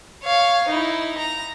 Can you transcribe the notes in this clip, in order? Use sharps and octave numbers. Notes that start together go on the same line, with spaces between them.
C#5 F5
D#4 E4
A#5